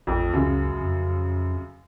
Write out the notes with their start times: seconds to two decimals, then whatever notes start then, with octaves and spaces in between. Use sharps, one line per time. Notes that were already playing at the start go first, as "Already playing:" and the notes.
0.07 A1 F2
0.33 C#2 F#2 C#3
0.79 F2